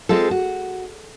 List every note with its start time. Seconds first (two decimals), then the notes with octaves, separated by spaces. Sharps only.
0.09 G#3 C4 F4 A4
0.31 F#4